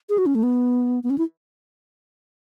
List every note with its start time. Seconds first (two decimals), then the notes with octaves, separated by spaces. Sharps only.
0.09 G#4
0.18 F#4
0.26 C#4
0.35 A3
0.43 B3
1.03 B3
1.10 C#4
1.18 E4